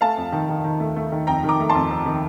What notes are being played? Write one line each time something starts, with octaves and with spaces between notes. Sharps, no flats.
A3 F5 A5
F2
D#3
D#3
D#3
A3
A3
D#3
F2 G5 A#5
D#3 A#5 D6
A3
A5 C6
F2
F2
D#3